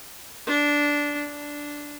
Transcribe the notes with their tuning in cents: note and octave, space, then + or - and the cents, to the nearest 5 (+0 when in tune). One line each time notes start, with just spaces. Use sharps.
D4 -10
D4 -5